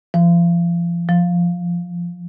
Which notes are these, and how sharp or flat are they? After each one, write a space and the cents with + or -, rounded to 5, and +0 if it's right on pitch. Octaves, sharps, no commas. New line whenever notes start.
F3 -35
F3 +0